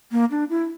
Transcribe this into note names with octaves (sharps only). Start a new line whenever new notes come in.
A#3
D4
E4